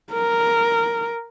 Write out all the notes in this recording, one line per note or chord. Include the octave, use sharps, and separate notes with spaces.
A#4